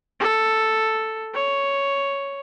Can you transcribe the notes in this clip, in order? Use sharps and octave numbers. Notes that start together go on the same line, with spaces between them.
A4
C#5